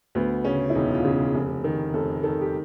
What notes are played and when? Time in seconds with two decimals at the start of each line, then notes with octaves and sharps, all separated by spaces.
0.15 D2 B3
0.45 C#3 C#4
0.70 E4
0.75 E1 D#4
0.94 F4
1.05 C#3
1.34 F1
1.64 D#3
1.93 F1 A4
2.23 D#3 A4
2.41 G4